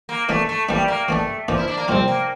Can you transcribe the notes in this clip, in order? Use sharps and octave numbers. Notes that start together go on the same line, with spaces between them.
A#3
E3 A3 A#3 D4
A3
E3 G3 A#3 D4
A#3
E3 A3 A#3 D4
E3 F3 A#3 D4
E4
D4
A#3
C2 A#2 F3 C4
A#3